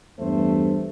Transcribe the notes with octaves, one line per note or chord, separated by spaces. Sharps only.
E2 G2 A3 C5